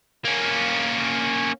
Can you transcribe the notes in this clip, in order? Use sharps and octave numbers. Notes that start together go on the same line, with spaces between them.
A#3 C#4